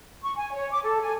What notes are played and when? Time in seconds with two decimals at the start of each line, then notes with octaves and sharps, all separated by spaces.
0.23 C#6
0.36 G#5
0.52 C#5
0.71 D6
0.83 A4
1.03 G#5